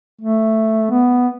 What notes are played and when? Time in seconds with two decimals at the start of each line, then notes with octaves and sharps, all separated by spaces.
0.21 A3
0.91 B3